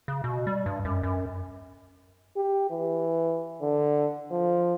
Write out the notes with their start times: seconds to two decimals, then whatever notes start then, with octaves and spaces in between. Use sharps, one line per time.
0.08 C#3
0.24 B2
0.47 G3
0.66 G2
0.85 F#2
1.03 F#2
2.36 G4
2.70 E3
3.62 D3
4.31 F3